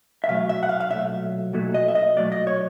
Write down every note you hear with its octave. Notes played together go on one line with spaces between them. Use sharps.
E5
B1 A#2 F#3 A3 F5
E5
F#5
F5
F5
B1 A#2 F#3 A3 E5
B1 A#2 F#3 A3
D#5
E5
D#5
B1 A#2 F#3 A3 D5
D#5
C#5